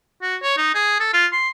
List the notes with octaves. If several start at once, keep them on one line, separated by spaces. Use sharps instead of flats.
F#4
C#5
D#4
G#4
A4
F4
C6